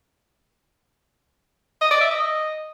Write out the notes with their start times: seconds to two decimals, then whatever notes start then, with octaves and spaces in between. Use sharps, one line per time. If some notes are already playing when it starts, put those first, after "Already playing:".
1.81 D#5
1.91 D5
2.01 E5
2.11 D#5